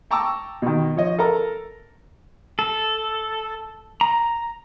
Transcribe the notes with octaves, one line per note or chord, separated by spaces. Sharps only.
G5 A5 A#5 C#6 D6 E6
B2 D#3
F3 C#5 D#5
A4 A#4 A#5
A4
A#5